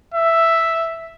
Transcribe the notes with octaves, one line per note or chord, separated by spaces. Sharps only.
E5